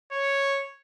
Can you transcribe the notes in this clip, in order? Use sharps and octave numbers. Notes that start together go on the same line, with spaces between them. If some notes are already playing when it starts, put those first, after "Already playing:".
C#5